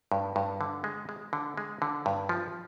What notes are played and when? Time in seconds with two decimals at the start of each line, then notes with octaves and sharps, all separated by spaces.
0.12 G2
0.36 G2
0.61 D3
0.84 G#3
1.09 G#3
1.33 D3
1.57 G#3
1.82 D3
2.06 G2
2.29 F3